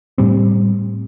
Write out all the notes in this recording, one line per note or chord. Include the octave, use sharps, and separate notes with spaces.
A2 G3 C4